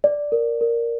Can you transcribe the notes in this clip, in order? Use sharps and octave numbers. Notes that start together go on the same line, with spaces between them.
D5
A#4
A#4